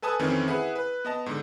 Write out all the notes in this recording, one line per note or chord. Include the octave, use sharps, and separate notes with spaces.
A4 B4 G#5 A5 D#6 E6
F2 D#3 E3 A3 C4 C#4
E4 G#4 B4 F#5
B4
B3 D#5 A5
G#2 D3